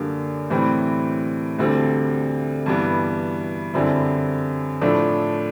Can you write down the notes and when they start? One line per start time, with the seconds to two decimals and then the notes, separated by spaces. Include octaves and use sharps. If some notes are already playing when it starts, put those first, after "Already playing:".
Already playing: F#2 D3 G3 A#3 D4
0.50 A2 E3 G3 C4
1.59 D2 D3 G3 C4
2.66 G2 E3 G3 B3
3.74 F#2 D3 G3 C4 E4
4.81 A2 F3 A3 D4